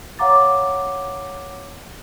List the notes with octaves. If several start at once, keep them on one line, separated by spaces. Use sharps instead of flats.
C#5 F5 F#5 A#5 D6 A6